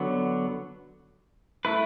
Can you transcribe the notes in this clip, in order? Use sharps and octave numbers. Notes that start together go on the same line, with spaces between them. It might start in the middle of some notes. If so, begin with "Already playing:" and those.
Already playing: D3 F#3 B3
A3 E4 B4